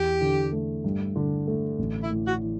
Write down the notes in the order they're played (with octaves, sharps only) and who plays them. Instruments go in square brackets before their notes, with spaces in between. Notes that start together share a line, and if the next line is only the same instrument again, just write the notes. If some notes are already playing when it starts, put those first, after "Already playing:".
Already playing: [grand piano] E2 [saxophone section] G4
[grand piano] D3
A3
G2
D3
A3
A1
[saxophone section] E4
[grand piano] A2
[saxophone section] F#4
[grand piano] E3